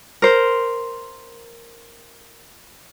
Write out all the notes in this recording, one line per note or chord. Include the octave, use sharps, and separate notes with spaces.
A#4 C5